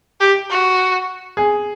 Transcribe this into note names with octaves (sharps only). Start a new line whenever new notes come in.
G4
F#4
G#4